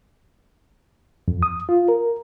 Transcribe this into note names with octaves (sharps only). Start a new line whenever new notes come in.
F2
D#6
F4
A#4